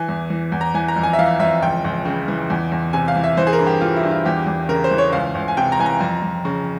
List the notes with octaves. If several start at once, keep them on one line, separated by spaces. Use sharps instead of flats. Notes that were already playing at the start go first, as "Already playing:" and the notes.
Already playing: E3 G#5
E2
E3
E2
A#5
E3 G#5
A#5
F2
G#5
E5
E3 F5
F2 E5
C#2 G5
C#2
C#3
E3
E2
E2
C3 G#5
F5
E3
E5
E3 C5
G#4
A#4
G2
G4
E3 F4
E4
G2
F4
E2 G4
E2
C#3 A#4
C5
E3
C#5
C#2 F5
C#2
G#5
C3 G5
A#5
E3 G#5
A#5
F2
F2
C#3